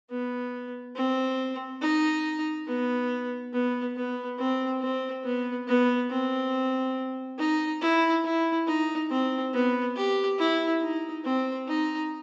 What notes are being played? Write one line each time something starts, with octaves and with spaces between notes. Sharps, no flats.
B3
C4
D#4
B3
B3
B3
C4
C4
B3
B3
C4
D#4
E4
E4
D#4
C4
B3
G4
E4
D#4
C4
D#4